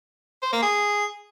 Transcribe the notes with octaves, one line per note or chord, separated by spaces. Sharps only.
C5
A#3
G#4